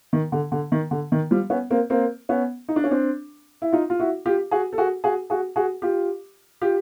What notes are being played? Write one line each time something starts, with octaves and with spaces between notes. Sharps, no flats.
D#3
D3
D3
D#3
D3
D#3
F3 G3
B3 C#4
A#3 C4
A#3 C4
B3 C#4
D#4
D4
C#4
C4 D4
E4
D#4 F4
F4
E4 F#4
F4 G4
F#4 G#4
A4
F#4 G#4
F#4 G#4
F#4 G#4
F#4 G#4
F4 G4
F4 G4